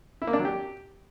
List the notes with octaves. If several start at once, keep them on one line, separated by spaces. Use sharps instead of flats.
E4
A#3
D4
F#3
G4